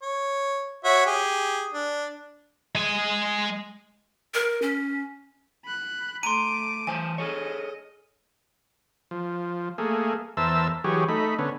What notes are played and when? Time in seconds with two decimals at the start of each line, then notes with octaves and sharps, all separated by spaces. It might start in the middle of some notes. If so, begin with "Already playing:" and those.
0.02 C#5
0.85 F#4 C#5 E5
1.06 G4 G#4
1.73 D4
2.75 G#3 G#5
4.34 A#4
4.62 C#4
5.65 B5 F#6
6.23 A3 A#5 C6 D6 D#7
6.87 E3 C5 G#5 A5
7.18 G#4 A4 C#5 D#5
9.11 F3
9.78 A3 A#3 G#4
10.37 E2 A#4 C5 E5 A5 E6
10.84 E3 F#3 G4 G#4 C#5
11.09 A3 D#4 B5
11.39 D3 B3 C#4